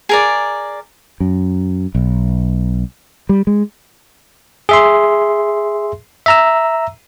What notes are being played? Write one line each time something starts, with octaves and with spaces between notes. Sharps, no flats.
G#4 A#4 D5
F#2
B1
G3
G#3
G#4 E5 C6
E5 A#5 E6